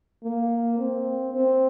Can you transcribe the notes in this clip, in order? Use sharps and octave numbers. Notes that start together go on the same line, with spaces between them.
A#3
C4
C4